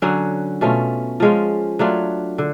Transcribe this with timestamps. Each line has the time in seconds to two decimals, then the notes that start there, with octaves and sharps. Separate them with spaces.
0.02 D3 F#3 C#4 F#4
0.61 B2 A3 C#4 F4
1.20 F3 G#3 C#4 F4
1.79 F#3 A3 D4 F4
2.38 D3